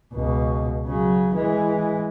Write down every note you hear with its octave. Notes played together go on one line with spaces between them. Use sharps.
C#2 B2
C#3 F#3
E3 G#3